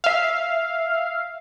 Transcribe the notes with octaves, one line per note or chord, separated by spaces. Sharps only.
E5 F5